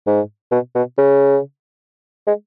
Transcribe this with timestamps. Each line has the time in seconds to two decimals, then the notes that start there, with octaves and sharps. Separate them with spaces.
0.07 G#2
0.52 B2
0.75 B2
0.98 C#3
2.27 G#3